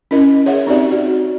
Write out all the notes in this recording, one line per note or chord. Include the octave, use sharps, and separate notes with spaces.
C#4 E4 A#4 D#5
G#4 C#5 E5 F#5
C4 D#4 F#4 G4 D5 E5
F#4